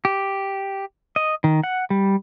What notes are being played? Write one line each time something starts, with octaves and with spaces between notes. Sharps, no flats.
G4
D#5
D#3
F#5
G3